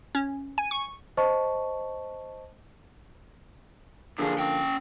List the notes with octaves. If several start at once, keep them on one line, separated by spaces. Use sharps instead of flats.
C#4
G#5
C#6
C5 D#5 A5 C#6
F#2 D3 F3 A#3 G#4
C#4 G5